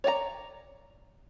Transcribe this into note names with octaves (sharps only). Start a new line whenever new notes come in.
C#5 D5 F#5 A#5